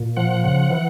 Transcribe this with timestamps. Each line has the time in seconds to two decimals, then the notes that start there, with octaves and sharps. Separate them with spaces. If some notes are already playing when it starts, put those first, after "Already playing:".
Already playing: A#2
0.17 F3 F#5
0.44 C#3 F#5
0.71 E3